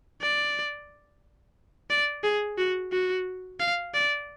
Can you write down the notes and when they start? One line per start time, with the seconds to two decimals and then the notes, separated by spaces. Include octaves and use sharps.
0.21 D5
1.90 D5
2.24 G#4
2.58 F#4
2.92 F#4
3.60 F5
3.94 D5